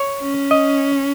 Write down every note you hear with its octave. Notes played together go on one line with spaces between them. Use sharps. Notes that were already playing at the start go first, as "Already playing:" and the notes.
Already playing: C#5
C#4
D#5